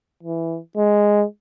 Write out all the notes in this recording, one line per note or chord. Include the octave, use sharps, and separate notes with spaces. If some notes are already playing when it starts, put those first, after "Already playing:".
E3
G#3